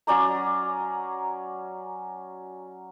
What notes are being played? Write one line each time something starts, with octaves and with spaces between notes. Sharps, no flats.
F#3 C#4 D5 A#5